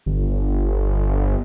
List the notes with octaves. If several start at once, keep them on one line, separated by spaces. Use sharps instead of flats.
G1